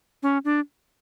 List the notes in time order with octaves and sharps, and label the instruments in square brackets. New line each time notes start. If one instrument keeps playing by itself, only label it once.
[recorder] C#4
D4